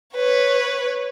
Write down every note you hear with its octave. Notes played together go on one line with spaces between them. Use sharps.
B4 C#5